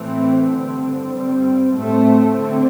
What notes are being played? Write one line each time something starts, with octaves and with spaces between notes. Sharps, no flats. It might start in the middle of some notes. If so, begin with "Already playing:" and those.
Already playing: A2 E3 A3 C4
G2 D3 C4
G2 G3 C4
A2 A3 C4
D3 C4